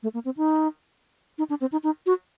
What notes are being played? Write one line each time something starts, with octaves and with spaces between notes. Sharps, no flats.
A3
A#3
C4
D#4
D#4
D4
C4
D#4
D#4
F#4